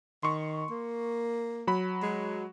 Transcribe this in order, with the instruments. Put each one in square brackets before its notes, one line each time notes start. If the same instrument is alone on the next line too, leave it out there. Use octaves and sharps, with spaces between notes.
[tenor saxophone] D#3 [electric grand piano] C6 C#6
[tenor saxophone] A#3
[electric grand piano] F#3 B5
[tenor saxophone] G#3